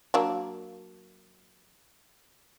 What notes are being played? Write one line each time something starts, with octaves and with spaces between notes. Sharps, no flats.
F#3 A#3 D4